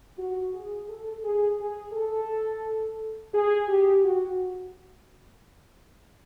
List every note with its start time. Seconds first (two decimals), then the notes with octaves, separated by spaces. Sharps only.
0.18 F#4
0.54 G#4
0.89 A4
1.24 G#4
1.59 G#4
1.94 A4
3.34 G#4
3.68 G4
4.03 F#4